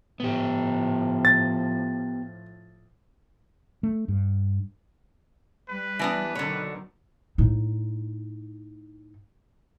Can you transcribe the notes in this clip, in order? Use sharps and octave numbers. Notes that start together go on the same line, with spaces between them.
A2 F3 B3 G4
A6
A3
G2
G3 B4
E3 B3 D4
B2 D3 D#3 F#3 C#5
A2 D#4